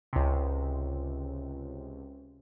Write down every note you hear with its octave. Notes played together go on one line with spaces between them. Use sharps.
C#2 C3